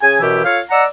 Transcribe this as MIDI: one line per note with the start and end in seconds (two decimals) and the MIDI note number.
0.02 0.18 49
0.02 0.18 68
0.02 0.18 80
0.20 0.42 42
0.20 0.42 47
0.20 0.42 52
0.20 0.42 64
0.20 0.42 67
0.45 0.61 65
0.45 0.61 69
0.45 0.61 73
0.45 0.61 77
0.71 0.84 74
0.71 0.84 75
0.71 0.84 78
0.71 0.84 82
0.71 0.84 88